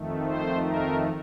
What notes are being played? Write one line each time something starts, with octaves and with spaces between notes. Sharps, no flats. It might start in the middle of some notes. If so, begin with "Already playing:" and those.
Already playing: F2 D#3 A3
C5
A#4